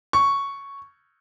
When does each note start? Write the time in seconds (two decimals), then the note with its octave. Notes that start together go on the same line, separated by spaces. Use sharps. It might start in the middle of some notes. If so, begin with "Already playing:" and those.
0.13 C#6